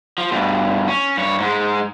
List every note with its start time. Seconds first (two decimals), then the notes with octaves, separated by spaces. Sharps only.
0.18 F3
0.32 G2 B2
0.88 C#4
1.17 G2 C#5
1.40 G#2 G#3